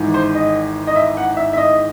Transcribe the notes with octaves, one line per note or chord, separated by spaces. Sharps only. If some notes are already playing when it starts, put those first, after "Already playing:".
Already playing: G#1 G#2 E3
C5
D#5
D#5
E5
F#5
E5
E5
D#5